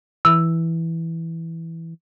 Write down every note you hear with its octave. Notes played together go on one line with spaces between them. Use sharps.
E3 E6